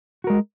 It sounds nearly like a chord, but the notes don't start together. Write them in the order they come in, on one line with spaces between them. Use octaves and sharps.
F#4 A#4 G#3